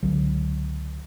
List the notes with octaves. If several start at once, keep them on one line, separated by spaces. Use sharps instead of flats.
C#2 D3 F#3